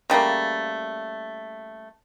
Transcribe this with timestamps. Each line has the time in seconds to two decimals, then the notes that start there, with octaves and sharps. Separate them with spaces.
0.10 C#3 G3 A3 A#3